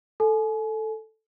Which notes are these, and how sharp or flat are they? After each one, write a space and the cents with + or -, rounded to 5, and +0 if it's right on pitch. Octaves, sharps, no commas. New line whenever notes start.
A4 +0 G#5 +35